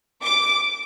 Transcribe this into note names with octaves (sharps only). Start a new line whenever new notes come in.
D6